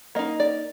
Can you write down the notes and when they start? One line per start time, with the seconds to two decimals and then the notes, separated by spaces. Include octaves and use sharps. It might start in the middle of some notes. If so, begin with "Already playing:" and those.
0.15 A#3 D#4 D#5
0.40 D5